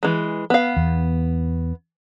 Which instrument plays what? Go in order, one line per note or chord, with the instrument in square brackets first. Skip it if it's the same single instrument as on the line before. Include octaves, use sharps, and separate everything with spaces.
[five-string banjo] E3 G#3
B3 F5
[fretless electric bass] E2